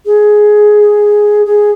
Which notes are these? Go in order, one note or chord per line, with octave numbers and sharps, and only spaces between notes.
G#4
G#4